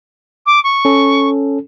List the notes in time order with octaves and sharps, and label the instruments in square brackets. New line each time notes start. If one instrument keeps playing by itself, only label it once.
[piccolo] D6
C#6
[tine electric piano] C#4 A4